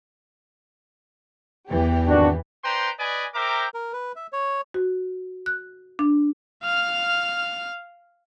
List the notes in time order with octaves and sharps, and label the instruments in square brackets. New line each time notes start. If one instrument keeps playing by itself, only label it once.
[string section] E2 E3 G4
[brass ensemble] G#1 D4 F#4
[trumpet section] D4 B4 C5 G5 A#5 C6
B4 D5 D#5 G#5
A#4 C5 E5 G5 A#5 D6
[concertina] A#4
B4
E5
C#5
[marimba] F#4
F#6
D4
[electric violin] F5 F6